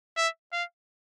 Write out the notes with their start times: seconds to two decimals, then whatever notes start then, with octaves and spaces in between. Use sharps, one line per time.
0.17 E5
0.53 F5